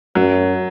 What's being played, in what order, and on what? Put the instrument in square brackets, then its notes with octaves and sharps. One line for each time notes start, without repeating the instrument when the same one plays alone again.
[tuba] F#2 [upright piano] F#3